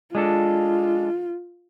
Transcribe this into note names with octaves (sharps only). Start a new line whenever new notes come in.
G#3 D4 F4 A4